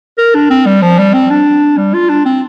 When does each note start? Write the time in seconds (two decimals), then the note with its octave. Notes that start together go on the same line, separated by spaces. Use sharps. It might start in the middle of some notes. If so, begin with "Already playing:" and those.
0.18 A#4
0.35 D4
0.50 C4
0.66 G3
0.82 F3
0.98 G3
1.13 C4
1.30 D4
1.77 G3
1.94 F4
2.09 D4
2.26 C4